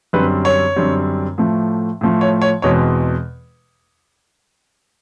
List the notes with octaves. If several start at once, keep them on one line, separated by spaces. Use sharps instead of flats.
F#2 D3 G3 C4 B4
C#5
F#2 D3 G3 C4
A2 F3 A3
A2 F3 A3
C#5
C#5
E2 B2 G#3 C4 C#5